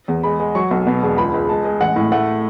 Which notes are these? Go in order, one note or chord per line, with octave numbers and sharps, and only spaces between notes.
E2
G#3 B5
G#3
F#3 C#6
B1
B2
E1
C#2 B5
C#2
G#3 A5
G#3
A1 F#5
A2
A3 F#5